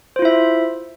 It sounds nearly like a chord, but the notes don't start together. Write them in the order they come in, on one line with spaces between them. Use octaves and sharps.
C5 F4 E4 E5